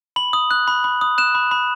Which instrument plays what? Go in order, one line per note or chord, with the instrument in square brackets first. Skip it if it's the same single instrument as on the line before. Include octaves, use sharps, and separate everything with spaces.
[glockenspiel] B5 F#7
D#6
F#6
B5
B5
D#6
F#6 E7
B5
B5